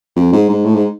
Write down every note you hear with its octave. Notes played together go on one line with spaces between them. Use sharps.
F2
G#2
G#2
A2
G#2